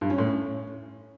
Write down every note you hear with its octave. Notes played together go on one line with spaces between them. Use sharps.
G2
C#4
A2
C#4